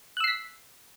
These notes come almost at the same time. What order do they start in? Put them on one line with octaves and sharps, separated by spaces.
F#6 E6 C7 B6